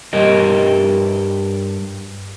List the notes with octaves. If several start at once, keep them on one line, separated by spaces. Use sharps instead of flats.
G2 G4 A#4 D#5